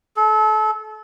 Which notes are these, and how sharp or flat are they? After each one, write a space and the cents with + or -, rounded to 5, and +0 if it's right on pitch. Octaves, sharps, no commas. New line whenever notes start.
A4 -30